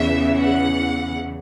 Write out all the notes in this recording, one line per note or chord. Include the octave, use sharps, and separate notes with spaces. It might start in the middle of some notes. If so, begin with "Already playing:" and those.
Already playing: E2 C#3 E3 E5
F#5